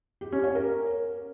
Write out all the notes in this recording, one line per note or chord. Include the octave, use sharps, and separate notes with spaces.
G4
C#4
C#5
A#4